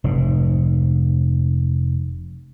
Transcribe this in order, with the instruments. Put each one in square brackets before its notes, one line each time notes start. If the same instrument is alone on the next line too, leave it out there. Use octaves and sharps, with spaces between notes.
[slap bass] F1 G#2